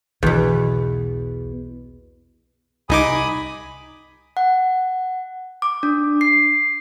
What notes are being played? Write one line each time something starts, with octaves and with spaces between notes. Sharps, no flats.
B1 E2 B2 D3
C2 D#4 G#5 B5 D6 D#6
F#5
D6
D4
C7